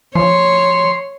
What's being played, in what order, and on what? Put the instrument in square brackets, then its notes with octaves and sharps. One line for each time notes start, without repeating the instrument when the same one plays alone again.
[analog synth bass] F3 [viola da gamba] C#5 [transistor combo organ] C6